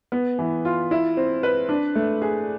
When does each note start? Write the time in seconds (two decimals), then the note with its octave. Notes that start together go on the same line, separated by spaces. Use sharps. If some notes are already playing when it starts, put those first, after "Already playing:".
0.12 B3
0.39 E3
0.65 F4
0.91 E4
1.17 C4
1.43 B4
1.69 D4
1.95 A3
2.22 G#4